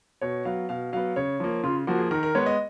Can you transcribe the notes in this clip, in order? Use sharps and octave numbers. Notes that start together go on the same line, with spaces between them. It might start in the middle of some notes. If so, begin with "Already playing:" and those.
B2 C#5
F#3 B3 F5
B2 F5
F#3 B3 F5
C#3 C#5
F3 A#3
C#3 F4
F3 A#3 F#4
G#4
D#3 A#4
A#4
G#3 B3 C#5
D#5